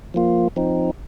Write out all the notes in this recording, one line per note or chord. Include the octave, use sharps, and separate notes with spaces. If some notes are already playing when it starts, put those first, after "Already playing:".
F3 A#3 F4
F3 C4 D#4